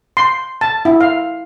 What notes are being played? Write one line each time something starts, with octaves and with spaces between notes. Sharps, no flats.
C6
A5
E4
F5